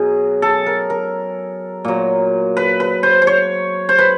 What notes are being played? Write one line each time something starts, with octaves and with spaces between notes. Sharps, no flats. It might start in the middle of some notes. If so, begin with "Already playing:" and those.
Already playing: B2 F#3 G#4
A4
A#4
A#4
A#2 F#3
B4
B4
C5
C5
C#5
C5
B4